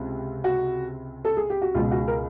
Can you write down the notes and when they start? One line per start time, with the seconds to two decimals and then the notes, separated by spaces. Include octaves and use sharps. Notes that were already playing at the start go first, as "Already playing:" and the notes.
Already playing: C#2 C3
0.44 F#4
1.25 A4
1.37 G#4
1.50 G4
1.62 F#4
1.75 C#2 B2 F4
1.91 F#4
2.08 A#4